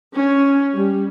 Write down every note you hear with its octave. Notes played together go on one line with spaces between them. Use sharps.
C#4
G3